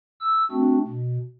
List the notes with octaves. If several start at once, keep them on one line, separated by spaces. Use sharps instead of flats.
E6
A3 C4 D4 F#4
B2